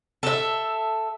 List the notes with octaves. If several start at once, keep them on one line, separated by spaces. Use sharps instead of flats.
A4 E5